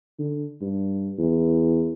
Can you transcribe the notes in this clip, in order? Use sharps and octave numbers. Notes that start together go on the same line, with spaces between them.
D3
G2
E2